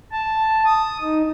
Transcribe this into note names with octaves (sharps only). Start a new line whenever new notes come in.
A5
D#6
D#4